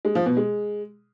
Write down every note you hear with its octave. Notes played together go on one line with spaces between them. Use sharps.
G#3
F3
B2
G#3